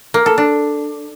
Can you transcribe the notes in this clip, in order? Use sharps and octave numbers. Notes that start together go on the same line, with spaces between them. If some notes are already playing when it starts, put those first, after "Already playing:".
A#3
A4
D4